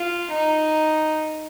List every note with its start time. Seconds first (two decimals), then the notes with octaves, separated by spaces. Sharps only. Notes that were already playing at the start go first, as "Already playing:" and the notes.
Already playing: F4
0.31 D#4